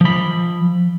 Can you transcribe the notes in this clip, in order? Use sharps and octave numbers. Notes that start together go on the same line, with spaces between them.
F3 B5